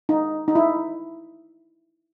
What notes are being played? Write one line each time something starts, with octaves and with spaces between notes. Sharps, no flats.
D#4
D#4
E4